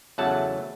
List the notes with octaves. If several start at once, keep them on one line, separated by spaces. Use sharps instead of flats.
E2 C#3 F#3 A3 F#5 A5